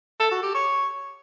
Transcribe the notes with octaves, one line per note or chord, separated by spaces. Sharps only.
A4
F#4
G4
C#5